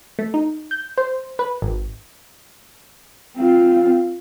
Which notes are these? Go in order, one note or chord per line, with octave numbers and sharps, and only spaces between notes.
A3
D#4
G6
C5
B4
G#1
C4 F4